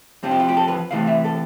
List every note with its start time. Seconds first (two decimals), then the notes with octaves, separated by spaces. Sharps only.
0.23 F2 C3 F3 C4 F4
0.31 G4
0.40 F4
0.49 G4
0.57 A4
0.68 B4
0.91 C3 E3 A3 F5
1.07 E5
1.25 A4